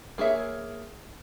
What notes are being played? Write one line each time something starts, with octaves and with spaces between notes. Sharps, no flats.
A#3 G#4 C#5 E5